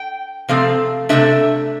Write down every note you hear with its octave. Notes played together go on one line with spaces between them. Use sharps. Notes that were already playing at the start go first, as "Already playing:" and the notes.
Already playing: G5
C3 F3 A3 C4 F5
C3 F3 A3 D4 E5